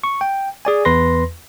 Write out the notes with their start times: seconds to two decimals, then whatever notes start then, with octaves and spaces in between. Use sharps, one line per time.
0.04 C#6
0.21 G5
0.65 G#4 D5 G#5
0.85 E2 B4 C6 A#6